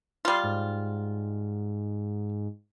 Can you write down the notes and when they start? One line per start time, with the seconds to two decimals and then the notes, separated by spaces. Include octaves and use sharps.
0.25 G3 F4 C6
0.44 G#2